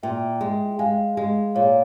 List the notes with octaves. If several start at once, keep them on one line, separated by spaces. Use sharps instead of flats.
A#2 E5 G5
G#3
G#3 F5 G#5
G#3
A#2 C#5 F5